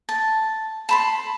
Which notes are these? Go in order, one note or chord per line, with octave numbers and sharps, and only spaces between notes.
A5
A5 B5 C6